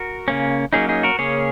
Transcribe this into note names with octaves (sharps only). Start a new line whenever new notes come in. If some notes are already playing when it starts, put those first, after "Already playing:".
Already playing: F#4 A#4
C#3 A#3 C#4
F#3 A#3 C#4 D#4 G#4
D#4 G#4
F#4 A#4
C#3 A#3 C#4 G#4 C#5